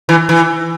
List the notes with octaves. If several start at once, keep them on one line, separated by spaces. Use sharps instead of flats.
E3
E3